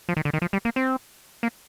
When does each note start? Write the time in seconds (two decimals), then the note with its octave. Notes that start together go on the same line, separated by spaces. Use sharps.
0.09 F3
0.17 D#3
0.25 D3
0.33 D#3
0.42 F3
0.53 G3
0.65 A#3
0.76 C4
1.43 A#3